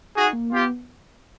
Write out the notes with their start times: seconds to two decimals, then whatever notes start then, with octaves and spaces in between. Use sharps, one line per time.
0.15 D#4 F#4 G#4
0.33 A#3
0.51 B3 F4 G4